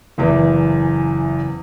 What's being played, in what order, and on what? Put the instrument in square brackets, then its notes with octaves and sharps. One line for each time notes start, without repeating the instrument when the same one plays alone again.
[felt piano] F#1 E2 E3